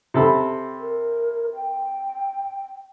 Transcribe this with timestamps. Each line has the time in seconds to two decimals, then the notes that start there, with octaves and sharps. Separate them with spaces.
0.14 C3 A4 B5
0.79 A#4
1.54 G5